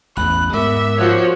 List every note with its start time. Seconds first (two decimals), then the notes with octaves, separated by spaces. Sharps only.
0.17 A1 E2 B5 F#6
0.53 G#2 B3 A#4 E5 D6 E6
0.98 F3 F#4 C#5